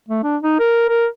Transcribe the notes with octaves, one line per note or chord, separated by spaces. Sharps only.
A3
D4
D#4
A#4
A#4